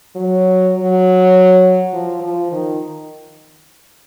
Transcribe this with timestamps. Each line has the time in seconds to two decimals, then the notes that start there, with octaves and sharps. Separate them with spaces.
0.16 F#3
0.75 F#3
1.93 F3
2.23 F3
2.52 D#3